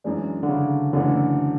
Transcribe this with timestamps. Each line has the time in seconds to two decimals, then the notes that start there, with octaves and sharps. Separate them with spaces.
0.04 F#2 E3 G#3 D4
0.43 D3
0.49 C#3
0.93 F#1 F#2 D3 E3 A3